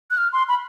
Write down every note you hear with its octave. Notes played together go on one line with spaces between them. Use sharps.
F#6
F6
C6
B5